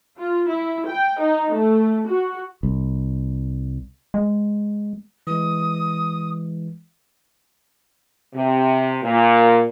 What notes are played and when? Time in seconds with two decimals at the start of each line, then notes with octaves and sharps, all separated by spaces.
0.18 F4
0.48 E4
0.87 G5
1.19 D#4
1.54 A3
2.08 F#4
2.63 C2
4.14 G#3
5.27 E3 G#3 D#6
8.34 C3
9.03 A#2